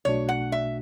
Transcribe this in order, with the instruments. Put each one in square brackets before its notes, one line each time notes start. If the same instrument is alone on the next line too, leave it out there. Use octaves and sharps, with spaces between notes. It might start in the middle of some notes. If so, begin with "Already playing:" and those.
[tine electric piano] B1 B2 A3 D4 F#4 [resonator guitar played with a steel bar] C#5
[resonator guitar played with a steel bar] F#5
E5